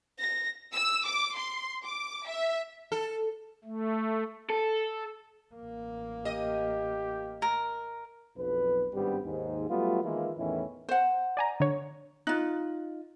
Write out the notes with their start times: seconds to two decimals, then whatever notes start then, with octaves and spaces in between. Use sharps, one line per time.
0.19 A#6
0.75 E6
1.07 D6
1.37 C6
1.83 D6
2.28 E5
2.92 A4
3.64 A3
4.50 A4
5.55 A1 A#3
6.25 G4 D#5
7.42 A#4
8.38 B1 F2 B4
8.93 G#1 G2 G3 B3 C4 G4
9.25 D#2 G#2
9.69 F#3 G3 A3 B3 F4
10.03 D#3 E3 G#3 A#3 E4 F4
10.37 E2 A2 D#3 E3 C#4 E4
10.89 C5 F#5
11.37 D5 G#5 A#5
11.60 D3 C#5
12.27 D#4 F4 F#6